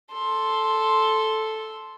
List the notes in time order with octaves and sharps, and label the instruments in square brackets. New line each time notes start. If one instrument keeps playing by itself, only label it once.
[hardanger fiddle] A4 C6